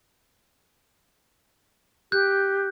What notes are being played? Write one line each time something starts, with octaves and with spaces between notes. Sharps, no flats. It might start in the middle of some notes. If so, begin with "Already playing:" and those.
G4 F#6 G6